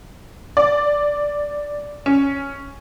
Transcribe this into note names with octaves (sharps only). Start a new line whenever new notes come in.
D5
C#4